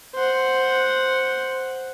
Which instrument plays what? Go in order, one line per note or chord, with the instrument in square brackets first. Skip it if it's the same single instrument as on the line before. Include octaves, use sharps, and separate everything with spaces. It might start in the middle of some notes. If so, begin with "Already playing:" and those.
[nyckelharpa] C5 F#5